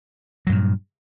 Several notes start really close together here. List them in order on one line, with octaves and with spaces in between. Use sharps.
F#3 G2 A#2